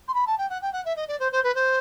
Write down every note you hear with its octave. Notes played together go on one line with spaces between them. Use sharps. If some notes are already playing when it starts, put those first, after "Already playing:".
C6
B5
A5
G5
F#5
G5
F#5
E5
D#5
D5
C5
C5
B4
C5